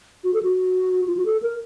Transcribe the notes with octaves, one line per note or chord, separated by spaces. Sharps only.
F#4
A4
F#4
F4
F#4
A4
A#4